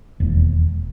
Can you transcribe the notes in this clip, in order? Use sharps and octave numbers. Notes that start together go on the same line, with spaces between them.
E1 D#2